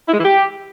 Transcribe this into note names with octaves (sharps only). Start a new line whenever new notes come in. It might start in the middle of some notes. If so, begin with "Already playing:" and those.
E4
G#3
E3
G4